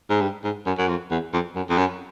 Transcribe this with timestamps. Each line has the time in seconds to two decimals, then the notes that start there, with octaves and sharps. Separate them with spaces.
0.10 G#2
0.21 G2
0.44 G#2
0.66 F#2
0.78 F#2
0.88 F2
1.11 E2
1.33 F2
1.55 F#2
1.70 F2
1.78 F#2